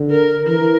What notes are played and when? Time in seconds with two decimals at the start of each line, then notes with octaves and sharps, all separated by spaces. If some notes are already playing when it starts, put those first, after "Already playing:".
Already playing: D3
0.11 A#4
0.47 E3 A#4